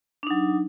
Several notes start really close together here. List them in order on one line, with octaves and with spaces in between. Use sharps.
D4 D#4 F#3